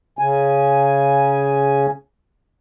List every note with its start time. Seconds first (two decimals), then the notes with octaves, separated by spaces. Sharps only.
0.19 C#3 G#5